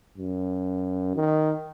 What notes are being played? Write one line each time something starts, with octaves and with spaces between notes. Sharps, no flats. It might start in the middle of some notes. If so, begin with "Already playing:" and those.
F#2
D#3